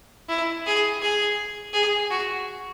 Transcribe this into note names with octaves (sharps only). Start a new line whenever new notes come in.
E4
G#4
G#4
G#4
F#4